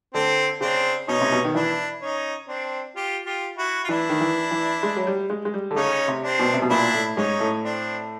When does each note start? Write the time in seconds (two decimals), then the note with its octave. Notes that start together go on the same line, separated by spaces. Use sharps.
0.14 D3 C4
0.61 C#3 C4 D4
1.08 B2 C#4 D#4
1.21 C3
1.32 B2
1.44 D#3
1.55 E3 D4 E4
2.01 C#4 D#4
2.48 C4 D4
2.96 F4 G4
3.26 F4 G4
3.57 E4 F#4
3.84 F4
3.89 E3 D4 E4
4.09 D#3
4.21 E3
4.51 E3
4.83 G#3
4.96 F#3
5.07 G3
5.30 G#3
5.45 G#3
5.54 G3
5.71 D3
5.76 C#3 C#4 D#4
6.08 C3
6.23 C4 D4
6.39 B2
6.54 C3
6.62 B2
6.70 A#2 D4 E4
6.94 A2
7.17 G#2 C#4 D#4
7.40 A2
7.63 C4 D4